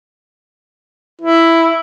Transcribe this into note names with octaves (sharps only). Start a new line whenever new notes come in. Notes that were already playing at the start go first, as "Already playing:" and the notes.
E4